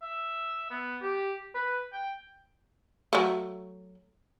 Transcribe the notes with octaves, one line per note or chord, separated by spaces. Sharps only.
E5
B3
G4
B4
G5
F#3 A3